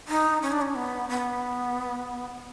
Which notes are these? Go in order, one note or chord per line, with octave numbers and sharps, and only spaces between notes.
D#4
C#4
D4
C#4
B3
B3